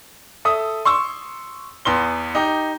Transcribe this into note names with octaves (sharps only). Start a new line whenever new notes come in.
A4 E5 D#6
C6 C#6 E6
E2 B3 C6 G7
D#4 G4